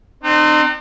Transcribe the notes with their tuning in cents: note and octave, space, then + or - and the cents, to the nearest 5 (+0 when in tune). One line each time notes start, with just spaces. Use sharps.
C4 +0 D#4 -40